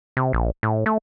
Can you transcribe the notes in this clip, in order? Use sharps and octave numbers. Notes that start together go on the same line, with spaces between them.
C3
A#1
A2
A3